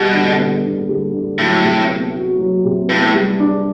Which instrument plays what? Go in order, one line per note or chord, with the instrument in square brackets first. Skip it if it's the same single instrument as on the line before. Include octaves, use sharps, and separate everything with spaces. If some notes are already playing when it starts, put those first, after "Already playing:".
Already playing: [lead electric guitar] B2 [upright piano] G3
[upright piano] D3
B3
D3
G3
D3
[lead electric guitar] A2 [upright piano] F#3
[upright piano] C3
B3
F#4
F#3
C3
[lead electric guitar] A2 [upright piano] B3
[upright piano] G3
D4